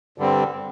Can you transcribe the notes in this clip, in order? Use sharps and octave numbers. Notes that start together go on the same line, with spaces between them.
G2 D3 G3 C4